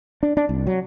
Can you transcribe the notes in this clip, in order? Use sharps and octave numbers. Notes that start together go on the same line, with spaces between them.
D4
D4
C2
F#3